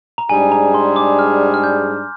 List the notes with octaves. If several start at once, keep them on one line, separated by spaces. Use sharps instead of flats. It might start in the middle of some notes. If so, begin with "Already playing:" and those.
A#5
G#2 G3 D4 G#4 G#5
A#5
C6
D6
F6
F6
G6